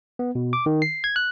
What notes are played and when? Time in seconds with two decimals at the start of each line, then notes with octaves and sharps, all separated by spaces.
0.19 B3
0.35 B2
0.53 D6
0.66 D#3
0.82 C7
1.04 G#6
1.16 F#6